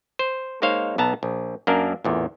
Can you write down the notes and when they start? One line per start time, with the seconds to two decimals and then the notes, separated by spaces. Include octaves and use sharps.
0.19 C5
0.62 G#3 A#3 D#4 C5 C#5 F5
0.98 B1 B3 A5 A#5
1.23 A#1
1.67 F#2 A#3 D4 A#4
2.04 A1 E2 A#2